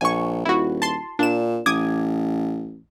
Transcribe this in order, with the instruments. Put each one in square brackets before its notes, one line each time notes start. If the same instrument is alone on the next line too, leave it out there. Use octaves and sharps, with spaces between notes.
[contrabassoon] A#1 [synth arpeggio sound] G#5 C#6
[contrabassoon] D#1 [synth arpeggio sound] E4 F#4
[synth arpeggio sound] A5 C6
[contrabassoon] A#2 [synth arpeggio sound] D4 E7
[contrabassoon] A1 [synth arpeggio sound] D6 D#6 G#6